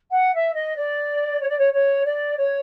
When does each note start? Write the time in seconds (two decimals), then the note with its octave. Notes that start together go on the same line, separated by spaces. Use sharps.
0.11 F#5
0.33 E5
0.55 D#5
0.76 D5
1.41 C#5
1.50 D5
1.58 C#5
1.74 C#5
2.05 D5
2.38 C#5